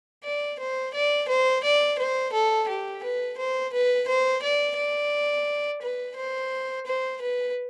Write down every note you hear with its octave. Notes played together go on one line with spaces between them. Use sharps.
D5
C5
D5
C5
D5
C5
A4
G4
B4
C5
B4
C5
D5
D5
B4
C5
C5
B4